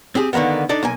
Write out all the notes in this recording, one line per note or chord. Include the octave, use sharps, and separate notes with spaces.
C4 G4 G#4
D3 D#3 G#3 A#3 B3
D4 D#4 A4 D5
B1 A#3 G#5